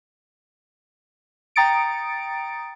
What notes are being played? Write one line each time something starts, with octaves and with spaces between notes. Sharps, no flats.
G5 A#5 D#6 A6 C#7 D7